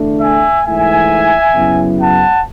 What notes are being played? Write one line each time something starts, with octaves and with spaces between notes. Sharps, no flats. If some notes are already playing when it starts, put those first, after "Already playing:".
Already playing: E2 D3 A3 D4
E5 G#5
G#2 E3 A3 E4 E5 G#5
F#2 C#3 F#3 B3 E4
F#5 A5